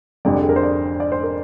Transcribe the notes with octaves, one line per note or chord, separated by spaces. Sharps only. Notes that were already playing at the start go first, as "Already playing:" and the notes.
F1 F2 D3 G3 D5
G4
G#4
A#4
C5
D5
D5
C5
A#4